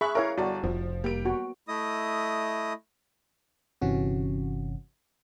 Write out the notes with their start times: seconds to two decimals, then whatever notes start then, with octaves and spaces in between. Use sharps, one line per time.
0.01 G#4 E5 B5 C#6 F#6
0.15 E4 A#4 C#5 E5 F5
0.38 G1 F#4 D5
0.64 F1 F3
1.04 G3 A#3 D7
1.25 B3 F#4
1.68 A3 E4 D#5 D#6
3.81 G1 C3 E3 C#4 F#4